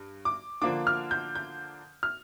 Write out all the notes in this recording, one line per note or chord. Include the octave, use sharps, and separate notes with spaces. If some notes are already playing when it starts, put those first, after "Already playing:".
Already playing: G2
D6
D3 F3 A#3 D4 D6
F6
G6
G6
F6